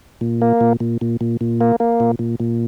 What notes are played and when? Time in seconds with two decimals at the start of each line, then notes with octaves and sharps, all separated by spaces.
0.21 A#2
0.41 A#3
0.61 A#2
0.80 A#2
1.01 A#2
1.21 A#2
1.41 A#2
1.61 A#3
1.80 A#3
2.00 A#2
2.19 A#2
2.40 A#2